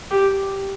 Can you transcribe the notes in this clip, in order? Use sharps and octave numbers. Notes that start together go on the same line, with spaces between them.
G4